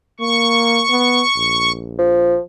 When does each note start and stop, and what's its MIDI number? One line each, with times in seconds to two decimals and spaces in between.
0.20 0.83 58
0.20 1.72 85
0.90 1.22 59
1.36 2.36 34
1.98 2.39 53